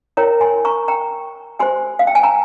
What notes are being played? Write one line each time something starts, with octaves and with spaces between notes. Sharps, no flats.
E4 A#4 C#5 G5 A#5
G#5 C6
A#5 C#6
G5 A#5
G4 C5 G#5 C6
F5
G5
G#5
A#5